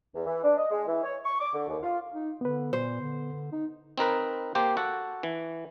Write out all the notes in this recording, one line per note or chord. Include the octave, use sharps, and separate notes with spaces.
E2
E3
D4
D#5
G#3
E3
C#5
C#6
D6
D3
D#2
F4
D#4
D3 B3 B4
A#2 C5
D3
D#4
C4 D#4 A#4 B4
A#3 G4 C5 G5
F#4 A4 F#5
E3